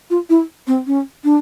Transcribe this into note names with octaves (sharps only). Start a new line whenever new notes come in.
F4
E4
C4
C#4
D4